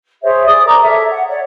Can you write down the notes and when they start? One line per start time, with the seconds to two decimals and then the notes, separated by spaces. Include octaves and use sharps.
0.22 G#4 C5 C#5 E5
0.46 G#4 D5 D#6
0.65 A#4 A#5 D6
0.81 A4 C#5 E5
1.10 F#5
1.28 C#5 D5